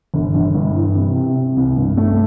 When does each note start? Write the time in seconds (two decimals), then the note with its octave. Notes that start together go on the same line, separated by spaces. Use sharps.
0.14 G1
0.34 G1
0.55 G2
0.75 E3
0.95 C3
1.15 C3
1.36 C3
1.56 C2
1.77 G2
1.97 A3